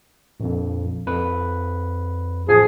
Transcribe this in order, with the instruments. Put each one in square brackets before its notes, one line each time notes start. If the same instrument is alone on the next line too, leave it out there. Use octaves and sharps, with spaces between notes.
[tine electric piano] A#1 F2
F2 B4
[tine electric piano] A1 F3 [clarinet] G#4